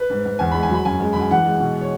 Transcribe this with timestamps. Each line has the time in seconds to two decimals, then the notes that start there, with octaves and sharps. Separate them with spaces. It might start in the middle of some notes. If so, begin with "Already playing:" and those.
Already playing: B4
0.10 G#2
0.25 G#2
0.39 E2 G#5
0.51 G#3 B5
0.63 G#5
0.69 F#3 B5
0.85 F#2 G#5
1.00 G#3
1.13 F#2 B5
1.21 G#5
1.31 E3 F#5
1.45 G#3
1.60 B2
1.81 C#5